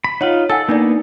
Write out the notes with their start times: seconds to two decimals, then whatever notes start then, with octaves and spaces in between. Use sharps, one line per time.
0.04 B5
0.21 D#4 F4 C#5 F#5 F#7
0.50 A4 F#5 G#5 E6
0.69 A#3 B3 D4 D#4 D5